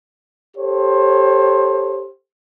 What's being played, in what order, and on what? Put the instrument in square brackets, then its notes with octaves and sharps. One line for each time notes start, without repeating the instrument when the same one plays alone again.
[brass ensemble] G4 A4 C5 C#5